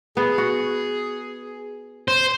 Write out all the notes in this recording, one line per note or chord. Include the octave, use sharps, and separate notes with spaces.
B3 G#4
F#4
C5